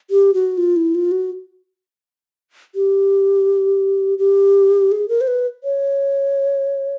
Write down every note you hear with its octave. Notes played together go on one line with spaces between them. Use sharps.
G4
F#4
F4
E4
F4
F#4
G4
G4
G#4
A#4
C5
B4
C#5